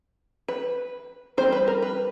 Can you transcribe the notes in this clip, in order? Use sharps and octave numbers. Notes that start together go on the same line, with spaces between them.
B4
G3 C4 D#4 C5
B4
A#4
B4